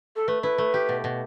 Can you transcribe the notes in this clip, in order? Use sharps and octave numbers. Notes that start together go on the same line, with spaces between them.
A4
A3 B4
E4 B4
A3
G4
B2
B2